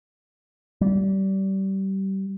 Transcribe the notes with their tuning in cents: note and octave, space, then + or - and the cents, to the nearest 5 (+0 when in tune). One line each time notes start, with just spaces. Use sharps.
G3 -25